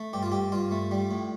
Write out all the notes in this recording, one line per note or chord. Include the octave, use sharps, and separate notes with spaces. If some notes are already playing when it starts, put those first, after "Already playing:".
Already playing: A3
G2 G4
F4
G2 G4
G2 F4
A3
G3
A2